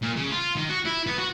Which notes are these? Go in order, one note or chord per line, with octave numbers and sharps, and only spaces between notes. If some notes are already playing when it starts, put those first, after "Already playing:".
A#2
C#3
F4
D#3
F#4
E4
B3
F#4